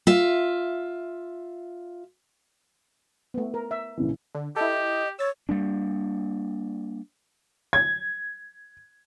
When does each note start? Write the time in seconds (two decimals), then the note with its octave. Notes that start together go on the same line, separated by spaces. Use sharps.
0.07 F4 E5
3.34 A3 B3
3.54 A#4
3.71 E5
3.97 A#1 C#3 E3
4.35 D3
4.56 E4 G4 A4 D#5
5.19 C#5 E6 A6
5.49 G3 A#3 D4
7.73 G#6